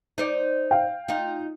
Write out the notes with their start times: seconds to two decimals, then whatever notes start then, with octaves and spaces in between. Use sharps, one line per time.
0.18 D#4 C5 D5
0.71 F5 G5
1.08 D#4 F4